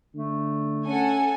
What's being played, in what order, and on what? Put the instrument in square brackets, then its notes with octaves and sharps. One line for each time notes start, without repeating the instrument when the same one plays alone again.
[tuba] D3 [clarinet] A3
[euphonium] C#4 [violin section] A4 F#5 G#5